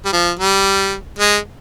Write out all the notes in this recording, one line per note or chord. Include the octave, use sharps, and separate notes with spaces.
G3
F3
G3
G#3